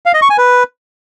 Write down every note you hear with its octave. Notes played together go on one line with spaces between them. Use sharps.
F5
D#5
C#6
G#5
B4